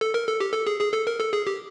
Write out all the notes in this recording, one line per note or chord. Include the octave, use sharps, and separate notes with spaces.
A4
A#4
A4
G4
A4
G#4
G#4
A4
A#4
A4
G#4
G4